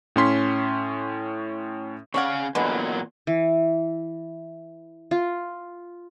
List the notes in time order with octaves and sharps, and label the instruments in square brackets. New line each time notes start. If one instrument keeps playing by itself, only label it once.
[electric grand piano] A2 C#4 C6 B6
[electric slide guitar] C#3 C#4 F5 [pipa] C#5 D5 F#5
[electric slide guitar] E2 A#2 F#3 [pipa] D3 G#3 B3
[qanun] E3
F4